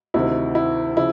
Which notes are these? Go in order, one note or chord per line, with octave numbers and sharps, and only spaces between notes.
D2 C3 D#3 E4
E4
C#3 F3 E4